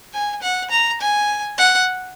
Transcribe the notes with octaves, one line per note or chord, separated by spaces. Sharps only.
G#5
F#5
A#5
G#5
F#5